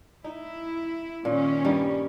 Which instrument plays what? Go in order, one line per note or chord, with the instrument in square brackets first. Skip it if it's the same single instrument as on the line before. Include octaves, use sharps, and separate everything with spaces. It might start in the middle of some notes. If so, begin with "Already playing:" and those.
[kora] D#4 [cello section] E4
[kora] A#2 [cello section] D#3 C#4
[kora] G2 G3 D#4